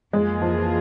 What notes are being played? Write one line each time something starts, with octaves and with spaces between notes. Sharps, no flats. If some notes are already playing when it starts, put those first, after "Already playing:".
F2 E3 G#3 A#3 F4 G#4
F3